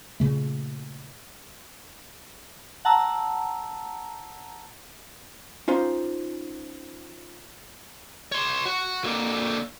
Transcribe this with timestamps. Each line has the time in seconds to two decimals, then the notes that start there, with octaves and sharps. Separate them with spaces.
0.20 A#2 C#3 A3
2.85 F#5 A5 A#5 E6
5.68 C#4 D#4 F4 C5
8.32 C#5 C6
8.66 F#4
9.04 D3 A#3